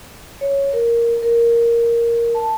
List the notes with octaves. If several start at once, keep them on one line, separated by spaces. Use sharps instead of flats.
C#5
A#4
A#4
A5